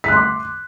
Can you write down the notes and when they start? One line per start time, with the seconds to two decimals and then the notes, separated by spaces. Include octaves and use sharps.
0.04 B6
0.08 F#6
0.12 C6
0.16 D6